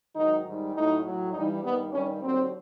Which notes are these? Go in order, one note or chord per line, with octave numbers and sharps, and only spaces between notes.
G#2 D#3 F#3 D#4
G#2 D#3 G3
A2 F#3 D#4
A2 F#3
G2 E3 G3 D#4
G2 D#3 G3 B3
G2 D#3 G3 C#4
D#2 D3 F#3 C4